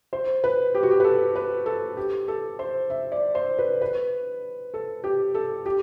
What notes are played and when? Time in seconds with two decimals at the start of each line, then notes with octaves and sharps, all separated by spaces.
0.13 C5
0.44 B4
0.75 G4
0.83 F#4
0.91 G4
1.00 B4
1.04 A4
1.36 B4
1.66 A4
1.97 G4
2.28 A4
2.59 C5
2.90 E5
3.12 D5
3.35 C5
3.59 B4
3.82 B4
4.74 A4
5.04 G4
5.34 A4
5.66 G4